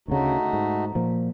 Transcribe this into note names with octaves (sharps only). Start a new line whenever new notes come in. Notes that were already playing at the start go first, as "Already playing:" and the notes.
D2 C#3 A3 D#4 F#4
G#2
A#2 F3